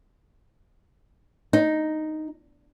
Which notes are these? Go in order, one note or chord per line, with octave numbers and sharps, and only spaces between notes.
D#4